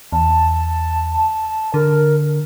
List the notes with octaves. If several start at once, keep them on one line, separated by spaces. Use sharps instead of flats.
E2 A5
A5
D3 A#4